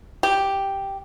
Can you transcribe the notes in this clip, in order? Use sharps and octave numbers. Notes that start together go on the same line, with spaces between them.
G4